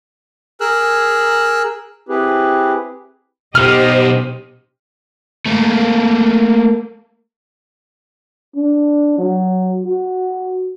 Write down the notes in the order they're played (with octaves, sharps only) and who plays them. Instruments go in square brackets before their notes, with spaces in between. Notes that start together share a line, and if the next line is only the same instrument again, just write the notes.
[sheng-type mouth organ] G#4 A#4 E6 F#6
[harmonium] C4 E4 G4 G#4 B4
[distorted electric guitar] B2 D#4 [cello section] G4 C5 D#5 [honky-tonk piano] F6
[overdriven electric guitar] A3 A#3
[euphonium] D4
F#3
F#4